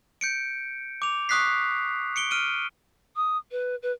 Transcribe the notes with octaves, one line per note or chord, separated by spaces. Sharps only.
G6 C#7 D7
D6 F7
C#6 D#6 F#6 B6 C7
C#7 D7 G7
F6 D7 D#7 G7
D#6
B4
B4